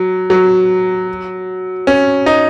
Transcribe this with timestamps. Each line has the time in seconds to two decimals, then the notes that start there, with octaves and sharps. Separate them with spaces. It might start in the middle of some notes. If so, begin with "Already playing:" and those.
Already playing: F#3
0.30 F#3
1.87 C#4
2.26 D#4